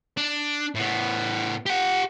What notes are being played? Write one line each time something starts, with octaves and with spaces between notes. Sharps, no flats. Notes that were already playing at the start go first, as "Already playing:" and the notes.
D4
A2 B3
G4 F#5